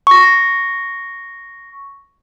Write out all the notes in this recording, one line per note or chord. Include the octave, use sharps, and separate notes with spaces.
C#6 A#6